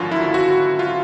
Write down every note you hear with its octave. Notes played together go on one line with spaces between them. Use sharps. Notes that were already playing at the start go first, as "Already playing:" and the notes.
Already playing: G#1 F#2 D3 F3 F4 F#4
E4
F#4
F4